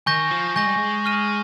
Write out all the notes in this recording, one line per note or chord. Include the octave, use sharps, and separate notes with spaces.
D#3 G#5 C#6 G6 A#6
F3
G#3 G#5 C#6 G6 A#6
G3
G#3
C#6 F6 A#6 D#7